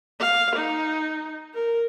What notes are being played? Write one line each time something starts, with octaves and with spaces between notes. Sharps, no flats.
F5
D#4
A#4